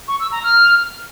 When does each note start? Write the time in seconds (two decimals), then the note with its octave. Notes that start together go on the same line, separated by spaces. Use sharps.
0.08 C#6
0.20 E6
0.32 A#5
0.44 F6